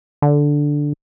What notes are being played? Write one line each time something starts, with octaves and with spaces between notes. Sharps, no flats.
D3